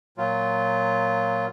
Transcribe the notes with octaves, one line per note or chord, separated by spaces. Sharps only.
A#2 F#3 F4